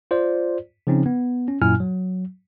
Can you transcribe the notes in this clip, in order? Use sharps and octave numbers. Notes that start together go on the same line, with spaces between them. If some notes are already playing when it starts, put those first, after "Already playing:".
F4 C5 D5
C#3 F3 C4 C#4 D#4
B3
C#4
F#2 A#2 F#3 E4 G#5 F6
F#3